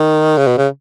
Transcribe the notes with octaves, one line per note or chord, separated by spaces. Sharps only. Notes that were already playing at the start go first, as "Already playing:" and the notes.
Already playing: D#3
C#3
B2
C#3